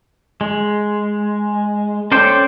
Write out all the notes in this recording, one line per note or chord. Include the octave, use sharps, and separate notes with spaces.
G#3
C#4 A4 C5 D5 G5